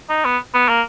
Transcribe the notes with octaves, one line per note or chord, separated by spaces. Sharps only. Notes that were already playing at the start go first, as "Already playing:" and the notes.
D#4
B3
B3
A#3